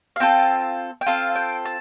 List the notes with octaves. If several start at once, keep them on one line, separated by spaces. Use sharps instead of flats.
F5
C4 F4 A4 G5
G5
C4 F4 A4 F5
G5
A5